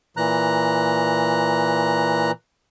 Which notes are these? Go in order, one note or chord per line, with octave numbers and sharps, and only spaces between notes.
A#2 E3 A#5 F#6